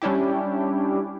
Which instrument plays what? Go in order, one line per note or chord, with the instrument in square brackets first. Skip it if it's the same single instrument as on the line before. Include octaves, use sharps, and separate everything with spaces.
[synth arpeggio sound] G3 C#4 D4 E4 G4